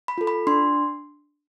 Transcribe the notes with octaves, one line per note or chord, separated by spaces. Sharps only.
B5
F4 A4
B5
D4 C6